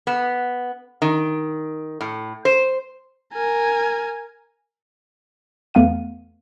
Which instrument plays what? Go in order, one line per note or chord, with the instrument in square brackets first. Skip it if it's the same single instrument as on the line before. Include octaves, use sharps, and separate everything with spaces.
[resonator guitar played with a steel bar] B3
D#3
A2
C5
[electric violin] A#4 G#5
[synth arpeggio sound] E2 A3 B3 F5 F#5 D#7